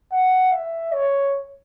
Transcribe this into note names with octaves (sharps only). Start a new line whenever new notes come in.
F#5
E5
C#5